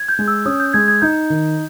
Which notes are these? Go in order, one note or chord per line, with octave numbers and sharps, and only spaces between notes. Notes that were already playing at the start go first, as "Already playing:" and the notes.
Already playing: G#6
G6
G#3
E6
C#4 D#6
G6
G#3 G#6
G#6
D#4 G6
D#3